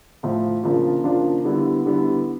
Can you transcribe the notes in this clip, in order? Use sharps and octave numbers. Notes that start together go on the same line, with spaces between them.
A2 F3 A3
C#3 F3 A#3 D4 F4
C#3 F3 A#3 D4 F4
D3 G3 B3 E4
D3 G3 B3 E4